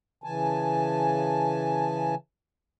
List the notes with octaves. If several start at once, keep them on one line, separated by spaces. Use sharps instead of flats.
C#3 E3 G#5 A5